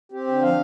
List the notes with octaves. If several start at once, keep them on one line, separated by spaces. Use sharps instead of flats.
C4 G4
D3
F3 F5